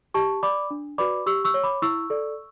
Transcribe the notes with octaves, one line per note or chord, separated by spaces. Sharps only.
G4 A5 C#6
D5 B5 D6
D4
F#4 B4 D5 B5 D6
G4 C#6 E6
C#6 E6
C#5
B5 D6
E4 C#6 E6
A4 D5